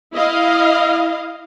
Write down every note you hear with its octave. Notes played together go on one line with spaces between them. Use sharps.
E4 D#5 F5